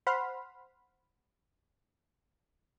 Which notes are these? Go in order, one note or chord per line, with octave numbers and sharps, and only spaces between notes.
C5 F#5 B5 C6 F6